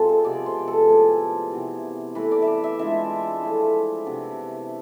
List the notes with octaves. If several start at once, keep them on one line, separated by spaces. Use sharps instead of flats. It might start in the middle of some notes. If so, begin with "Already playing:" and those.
Already playing: C3 G#3 C4 F4 A4
C5
C3 F3 B3 D5
C5
A4
A2 F3 A3 G#4
C3 E3 B3
E3 A3 E4 B4
D5
D5 E5
E5
E3 G#3 D4 F4 E5
F3 A3 E4
C3 E3 B3 D4